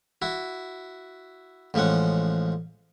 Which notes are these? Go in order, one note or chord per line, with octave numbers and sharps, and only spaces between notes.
E4 F#4
A1 F3 G#3 C#4 F#5